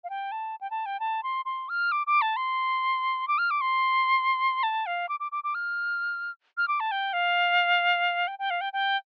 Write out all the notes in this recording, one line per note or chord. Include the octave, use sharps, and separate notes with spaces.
F5
G5
A5
G5
A5
G5
A5
C6
C6
F6
D6
D6
A5
C6
D6
F6
D6
C6
A5
F5
D6
D6
D6
D6
F6
F6
D6
A5
G5
F5
G5
G5
F5
G5
G5